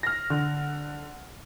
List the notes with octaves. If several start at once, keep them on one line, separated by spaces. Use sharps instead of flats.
F6 A#6
D3